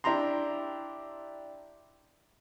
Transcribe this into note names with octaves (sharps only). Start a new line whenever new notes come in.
D4 E4 G4 A#5 C6